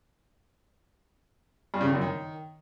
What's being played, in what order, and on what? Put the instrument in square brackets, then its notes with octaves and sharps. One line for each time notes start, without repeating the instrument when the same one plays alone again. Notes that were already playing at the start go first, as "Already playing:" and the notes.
[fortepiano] G2
C#3
D#3
F#2
D#3